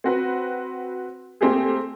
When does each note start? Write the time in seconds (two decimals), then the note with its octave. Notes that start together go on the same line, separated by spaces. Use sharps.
0.04 C4 F#4 B4
1.41 A3 A#3 C4 G4 G#4